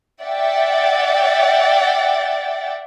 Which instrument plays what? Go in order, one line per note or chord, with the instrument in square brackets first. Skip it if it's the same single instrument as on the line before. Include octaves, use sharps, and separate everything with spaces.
[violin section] D5 E5 F#5 G5 A6